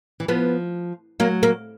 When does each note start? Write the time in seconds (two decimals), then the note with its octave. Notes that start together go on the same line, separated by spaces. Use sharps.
0.20 E3
0.28 F3 B3
1.20 F#3 A#3
1.43 A#3